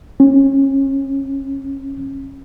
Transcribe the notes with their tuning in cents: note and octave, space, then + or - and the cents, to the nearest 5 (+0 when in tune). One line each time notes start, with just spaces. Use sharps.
C#4 -30